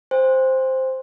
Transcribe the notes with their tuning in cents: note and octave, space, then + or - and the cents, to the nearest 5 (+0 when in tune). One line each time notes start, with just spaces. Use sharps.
C5 +0 G5 +45